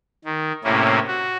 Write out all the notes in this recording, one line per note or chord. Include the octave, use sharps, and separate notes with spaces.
D#3
A2 C3 A#3 C#4 E4
F#4